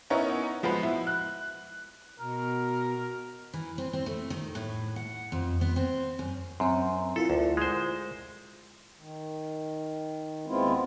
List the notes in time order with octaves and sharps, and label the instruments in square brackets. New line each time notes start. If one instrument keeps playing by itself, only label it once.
[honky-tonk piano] B3 C#4 D#4 E4 A#4 C#5
F3 G#3 B3 F#4 B5
E4
F#6
[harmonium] B2 [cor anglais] A#4
[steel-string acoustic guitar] E3
C4
C4
A3
D#3
A2
F#5
F2
B3
C4
F#2
[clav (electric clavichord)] F#2 [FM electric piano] C4 C6
[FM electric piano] E4 F4 A#4 [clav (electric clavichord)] A4
[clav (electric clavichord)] D2
G#3 C5
[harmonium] D#3
D#2 G#3 B3 C4 E4 F4